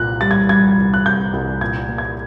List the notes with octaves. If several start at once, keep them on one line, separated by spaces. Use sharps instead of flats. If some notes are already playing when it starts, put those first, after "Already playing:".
Already playing: C2 A#2 A#3 F#6
G3 A6
G#6
G3 G#6
C2
F#6
C2 G6
C2
A#2 G#6
A#3
G#6